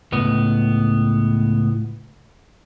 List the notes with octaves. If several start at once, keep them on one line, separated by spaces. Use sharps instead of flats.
C#2 A2 B3